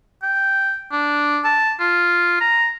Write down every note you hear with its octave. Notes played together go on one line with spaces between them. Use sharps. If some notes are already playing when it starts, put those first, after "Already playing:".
G5
D4
A5
F4
A#5